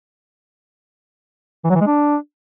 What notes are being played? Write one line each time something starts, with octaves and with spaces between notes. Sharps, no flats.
E3
F#3
E3
G#3
D4